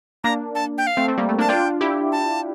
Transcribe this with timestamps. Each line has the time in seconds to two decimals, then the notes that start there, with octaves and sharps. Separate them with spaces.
0.24 A#3 D4 A#5
0.55 A5
0.78 G5
0.87 F5
0.97 A3 C4
1.08 A3 C4
1.18 G3 A#3
1.29 A3
1.38 A#3 D4 A5
1.49 D4 F4 G5
1.81 E4 G4
2.12 A5